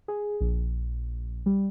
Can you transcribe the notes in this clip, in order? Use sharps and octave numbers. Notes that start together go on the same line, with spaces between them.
G#4
A#1
G3